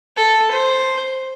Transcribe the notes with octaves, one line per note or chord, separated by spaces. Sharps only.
A4
C5